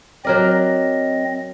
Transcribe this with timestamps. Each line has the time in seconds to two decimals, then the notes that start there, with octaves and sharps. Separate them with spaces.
0.25 F#3 C4 A#4 D5 D#5